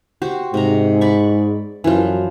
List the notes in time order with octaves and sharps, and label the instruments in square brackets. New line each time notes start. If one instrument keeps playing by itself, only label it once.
[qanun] F#4 G4 C5
[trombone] G#2 [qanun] C3 A#5
[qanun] D5 B5 C#6
[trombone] F#2 [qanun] E3 F3